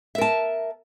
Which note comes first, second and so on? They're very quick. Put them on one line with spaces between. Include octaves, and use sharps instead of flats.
E5 A#4 A5